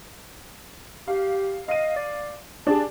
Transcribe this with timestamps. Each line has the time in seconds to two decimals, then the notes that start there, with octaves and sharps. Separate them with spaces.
1.08 G4 F5
1.68 D#5 F5 D#7
1.96 D5
2.67 D4 G4 G#4 A5